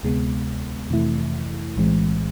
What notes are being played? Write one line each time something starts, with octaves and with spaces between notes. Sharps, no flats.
D2 C3 G#3 B3
F2 C3 E3 A3 E4
B1 A2 E3 G#3 C4